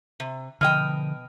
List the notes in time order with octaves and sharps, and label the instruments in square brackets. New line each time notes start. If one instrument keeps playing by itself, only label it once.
[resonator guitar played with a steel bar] C3
[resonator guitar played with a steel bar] B2 D#5 G5 [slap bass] D3 F3 [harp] F6